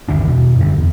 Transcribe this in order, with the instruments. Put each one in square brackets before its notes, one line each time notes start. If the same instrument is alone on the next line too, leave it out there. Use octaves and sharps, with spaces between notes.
[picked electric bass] G1 D#2 D3 D4
E1 B2
F#2 D3
E2